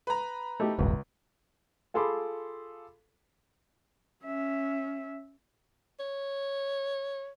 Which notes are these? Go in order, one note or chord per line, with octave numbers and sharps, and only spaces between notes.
B4 A#5
A3 D#4 G4
D#1 G#1 C#2
F4 G#4 A4 B5 C6 D6
C#4 E5
C#5